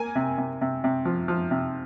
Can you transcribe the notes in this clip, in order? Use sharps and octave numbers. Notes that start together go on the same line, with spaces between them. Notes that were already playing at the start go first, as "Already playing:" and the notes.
Already playing: A#3 G#5
C3
C3
C3
C3
F3
F3
C3